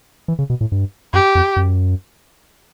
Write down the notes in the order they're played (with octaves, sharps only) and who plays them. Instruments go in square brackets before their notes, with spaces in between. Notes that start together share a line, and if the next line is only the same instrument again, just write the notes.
[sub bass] E3
C#3
B2
A2
G2
[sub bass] F#2 [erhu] G4
[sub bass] F2
F#2